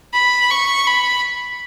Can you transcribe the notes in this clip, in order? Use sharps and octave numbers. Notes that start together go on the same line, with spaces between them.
B5
C#6
B5